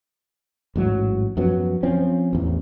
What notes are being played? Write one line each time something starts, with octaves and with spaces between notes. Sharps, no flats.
A1 G#2 F#3
F#2 F3 F#3 B3
F3 C4 C#4
A1 E2